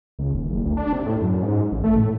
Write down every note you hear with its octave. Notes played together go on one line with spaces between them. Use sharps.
C#2
D#1
F#1
D2
D4
C3
A2
F#2
G#2
A1
A3
A2